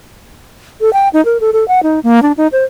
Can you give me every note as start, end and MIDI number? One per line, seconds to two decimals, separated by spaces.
0.81 0.92 69
0.93 1.09 79
1.13 1.23 63
1.25 1.38 70
1.40 1.50 69
1.53 1.67 69
1.68 1.82 78
1.83 2.00 63
2.03 2.22 58
2.22 2.32 62
2.37 2.47 63
2.52 2.64 72